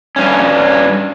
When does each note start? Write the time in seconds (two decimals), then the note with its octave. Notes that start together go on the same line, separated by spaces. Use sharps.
0.16 G2 C#4